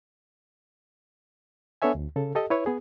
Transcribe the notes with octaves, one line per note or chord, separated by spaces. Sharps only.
B3 D4 A4 C#5 E5 G#5
D2
C#3 A4
G4 A4 D#5
E4 B4 C#5
B3 G#4